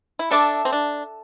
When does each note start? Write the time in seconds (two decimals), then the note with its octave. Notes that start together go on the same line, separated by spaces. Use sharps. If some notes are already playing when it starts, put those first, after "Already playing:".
0.19 E4
0.31 D4 A4 E5 A5 D6
0.65 C4
0.72 D4